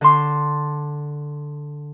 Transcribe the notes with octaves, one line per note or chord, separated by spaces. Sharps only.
D3 A5 C6 D6